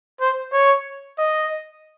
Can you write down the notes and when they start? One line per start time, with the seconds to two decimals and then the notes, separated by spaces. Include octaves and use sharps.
0.20 C5
0.53 C#5
1.19 D#5